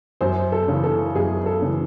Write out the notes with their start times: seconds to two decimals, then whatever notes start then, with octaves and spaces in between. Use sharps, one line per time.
0.21 F#2 C5
0.52 A4
0.68 C#3 E3
0.84 A4
1.15 F#2 G#4
1.46 A4
1.62 C#3 E3